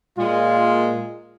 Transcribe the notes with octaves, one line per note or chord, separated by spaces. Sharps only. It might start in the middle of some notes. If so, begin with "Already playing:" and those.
A#2 G#3 F4